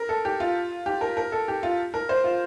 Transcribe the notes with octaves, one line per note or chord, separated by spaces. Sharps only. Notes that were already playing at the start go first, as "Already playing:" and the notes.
Already playing: A#4
A4
G4
F4
G4
A#4
A#4
A4
G4
F4
A#4
C5
F4